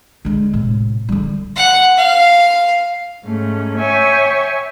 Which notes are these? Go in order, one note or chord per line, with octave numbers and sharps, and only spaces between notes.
D3 G#3
A2 C3
D3 G3
F#5
F5
G#2 A3 C#4
C#5 E5 G5 G#5 C#6